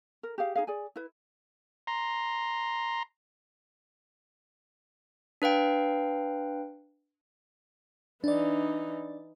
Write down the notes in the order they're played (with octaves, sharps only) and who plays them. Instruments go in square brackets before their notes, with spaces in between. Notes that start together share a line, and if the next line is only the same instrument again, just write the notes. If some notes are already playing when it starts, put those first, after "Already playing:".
[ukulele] A#4
G4 G#4 F5
D#4 G#4 F5
G#4 D5 G#5
E4 B4
[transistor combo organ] A#5 C6
[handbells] D4 B4 F5 G5
[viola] E3 D#4 [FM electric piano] D4 D5